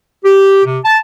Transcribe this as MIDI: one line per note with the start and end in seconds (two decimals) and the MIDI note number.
0.24 0.63 67
0.65 0.78 48
0.85 0.97 81